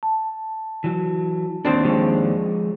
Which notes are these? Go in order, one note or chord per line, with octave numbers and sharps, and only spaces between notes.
A5
E3 F#3
D#2 C4 D4
F3 G#3 C#5